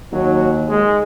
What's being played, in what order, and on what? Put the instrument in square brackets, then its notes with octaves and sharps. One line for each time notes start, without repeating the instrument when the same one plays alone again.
[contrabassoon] D#2 [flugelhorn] F#3
[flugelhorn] G#3